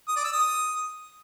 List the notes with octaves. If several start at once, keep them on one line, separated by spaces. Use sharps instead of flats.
D#6
D5
E6
D#6